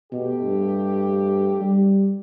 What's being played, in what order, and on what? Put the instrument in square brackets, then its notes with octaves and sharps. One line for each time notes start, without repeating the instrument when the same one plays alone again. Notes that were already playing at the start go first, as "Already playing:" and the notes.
[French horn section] F2 A3 G4 [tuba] B2
[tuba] G2
G3